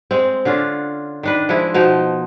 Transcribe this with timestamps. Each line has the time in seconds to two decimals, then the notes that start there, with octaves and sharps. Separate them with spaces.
0.11 G#3 C4
0.45 D3 C#4 D4 F4
1.23 D#3 D4 B4
1.49 F3 G#3 E4
1.74 B2 F3 D#4 G5